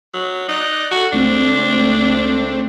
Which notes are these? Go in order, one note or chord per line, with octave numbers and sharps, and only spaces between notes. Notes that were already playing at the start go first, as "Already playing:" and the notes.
F#3
D#4 D5 F#6
F#4 A4
C#2 A3 C4 D4